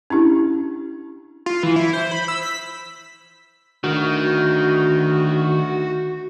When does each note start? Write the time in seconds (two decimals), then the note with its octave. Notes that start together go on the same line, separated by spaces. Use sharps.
0.10 C#4 D4 E4 G4
1.46 F4
1.63 E3
1.76 E4
1.93 C5
2.11 B5
2.28 E6
2.42 B6
3.84 D2 D#3 F#4